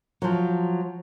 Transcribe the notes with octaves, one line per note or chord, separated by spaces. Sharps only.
F3 F#3